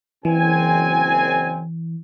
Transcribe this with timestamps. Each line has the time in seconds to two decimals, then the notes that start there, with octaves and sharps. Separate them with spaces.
0.25 F#1 E3 C4 G#5